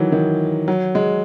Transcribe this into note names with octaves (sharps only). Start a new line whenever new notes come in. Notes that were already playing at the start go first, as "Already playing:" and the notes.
Already playing: D#3 E3 F#3
D#3
F#3
G#3